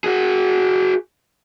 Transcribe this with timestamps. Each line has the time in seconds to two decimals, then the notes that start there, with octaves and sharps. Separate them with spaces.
0.04 F#4 G#4